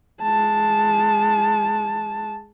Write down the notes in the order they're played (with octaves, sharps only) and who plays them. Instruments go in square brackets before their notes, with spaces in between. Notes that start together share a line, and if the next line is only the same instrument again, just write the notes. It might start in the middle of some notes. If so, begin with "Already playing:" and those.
[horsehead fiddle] G#3 A5